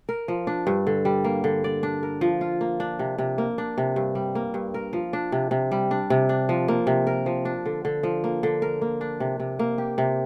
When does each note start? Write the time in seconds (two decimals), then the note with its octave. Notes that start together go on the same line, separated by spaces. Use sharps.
0.09 A#4
0.28 F3
0.47 D4
0.67 G2
0.87 D3
1.05 G3
1.24 A#3
1.44 D3
1.64 D5
1.83 D4
2.03 A#4
2.21 F3
2.41 F4
2.61 A#3
2.80 D4
2.99 C3
3.18 C3
3.38 A#3
3.58 D4
3.78 C3
3.96 G2
4.15 G3
4.35 A#3
4.54 G2
4.74 A#4
4.93 F3
5.13 D4
5.32 C3
5.51 C3
5.72 G3
5.91 D4
6.10 C3
6.29 D4
6.49 F3
6.68 A#3
6.87 C3
7.07 A#4
7.26 F3
7.45 D4
7.66 D3
7.85 D3
8.03 F3
8.24 A#3
8.43 D3
8.62 A#4
8.82 A#3
9.01 D4
9.20 C3
9.40 C3
9.59 A#3
9.78 G4
9.98 C3